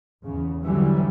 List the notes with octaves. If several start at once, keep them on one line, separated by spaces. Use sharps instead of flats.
E2 C#3
F2 D3 E3 F#3 G3